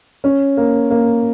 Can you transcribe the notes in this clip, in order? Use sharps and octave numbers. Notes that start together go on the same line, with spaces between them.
C#4
A#3
A#3